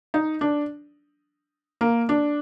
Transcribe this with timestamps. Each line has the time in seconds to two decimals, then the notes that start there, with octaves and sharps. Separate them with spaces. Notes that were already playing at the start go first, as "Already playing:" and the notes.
0.14 D#4
0.41 D4
1.81 A#3
2.09 D4